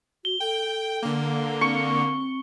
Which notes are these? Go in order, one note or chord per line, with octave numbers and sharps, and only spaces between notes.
F#4 G7
A4 G5
D3 A#3
C4 C#6